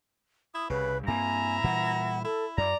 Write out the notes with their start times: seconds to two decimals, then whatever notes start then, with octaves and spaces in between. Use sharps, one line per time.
0.54 E4 D#6
0.70 C2 C#3 B4
1.08 G2 A#3 C4 E4 G#5 A#5
1.64 A#2 E3 G3 F#5
2.24 E4 A4
2.58 F#2 D5 A#5